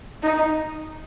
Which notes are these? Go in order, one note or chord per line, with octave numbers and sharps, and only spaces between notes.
D#4